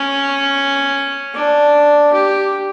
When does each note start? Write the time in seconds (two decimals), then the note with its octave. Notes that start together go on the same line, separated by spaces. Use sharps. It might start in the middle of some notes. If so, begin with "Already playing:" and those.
Already playing: C#4
1.34 D4
2.13 G4